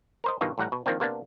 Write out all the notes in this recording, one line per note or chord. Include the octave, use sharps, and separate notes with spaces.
A#4 C5 D#5
G2 B2 D#3 F4
A1 A2 G3 F#5 A#5
B2
D#3 F3 A#3 C4 D4
C3 A#3 B3 D4